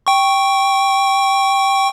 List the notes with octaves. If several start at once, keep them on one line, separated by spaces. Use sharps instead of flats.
G5 C#6